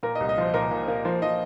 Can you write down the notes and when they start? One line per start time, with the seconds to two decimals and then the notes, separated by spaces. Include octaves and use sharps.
0.03 A#2 A#4
0.15 D#5
0.20 C2
0.29 D#5
0.38 F3 C5
0.54 A#2 A#4
0.71 A#2
0.88 A#3
1.05 F3 C5
1.22 F3 D#5